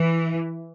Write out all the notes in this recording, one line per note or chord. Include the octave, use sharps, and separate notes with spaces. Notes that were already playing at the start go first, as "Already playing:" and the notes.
Already playing: E3